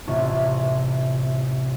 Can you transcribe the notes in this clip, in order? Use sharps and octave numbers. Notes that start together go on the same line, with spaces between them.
A1 C3 E4 F4 C#6